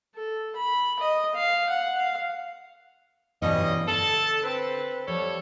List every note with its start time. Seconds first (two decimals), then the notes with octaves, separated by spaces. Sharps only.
0.16 A4
0.56 B5
0.99 D#5
1.35 F5
1.69 F#5
1.98 F5
3.42 G2 B2 E3 G3 C#4 D#5
3.88 D3 A4 A5
4.43 C4 B4
5.08 F3 G3 A4 C#5